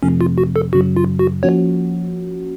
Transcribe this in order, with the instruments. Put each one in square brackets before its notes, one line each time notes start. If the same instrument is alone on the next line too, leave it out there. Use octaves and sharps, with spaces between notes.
[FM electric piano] F2 C3 F3 A3 [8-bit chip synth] C#4
[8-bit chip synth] F4
F#4
A4
[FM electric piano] F#2 C#3 F#3 [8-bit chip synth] F#4
[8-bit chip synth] F4
F#4
[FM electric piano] F3 A#3 C#4 F#4 [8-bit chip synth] C#5